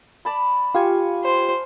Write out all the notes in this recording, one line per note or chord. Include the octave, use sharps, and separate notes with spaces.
D5 A5 B5
F4 G4 F5 G#5 C#6
C5